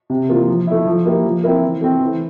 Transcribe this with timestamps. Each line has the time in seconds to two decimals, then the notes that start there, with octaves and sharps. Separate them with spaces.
0.10 C3
0.29 E3 A#3 F4
0.48 F3
0.67 A3 E4
0.86 F3
1.05 A#3 E4 G4 A#4
1.25 F3
1.44 C4 E4 A#4
1.63 E3
1.81 A3 C4
2.01 E3